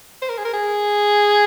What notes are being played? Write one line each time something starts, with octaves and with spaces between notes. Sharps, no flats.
C5
A#4
G#4
A#4
G#4